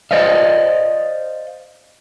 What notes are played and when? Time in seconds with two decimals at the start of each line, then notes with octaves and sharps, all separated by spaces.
0.11 C5 D5 D#5 F5